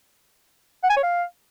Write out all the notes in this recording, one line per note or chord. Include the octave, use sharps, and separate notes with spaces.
F#5
G#5
C#5
F5